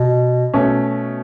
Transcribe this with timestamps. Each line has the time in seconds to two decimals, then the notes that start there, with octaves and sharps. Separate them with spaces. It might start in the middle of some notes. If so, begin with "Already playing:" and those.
Already playing: B2
0.54 B2 A3 C#4